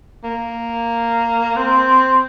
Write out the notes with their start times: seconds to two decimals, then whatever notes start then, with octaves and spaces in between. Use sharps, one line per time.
0.24 A#3
1.56 C4